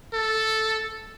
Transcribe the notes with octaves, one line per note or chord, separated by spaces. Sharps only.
A4